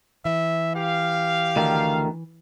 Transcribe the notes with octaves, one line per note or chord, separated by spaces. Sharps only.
E3 E5
G4 F5
D2 D#3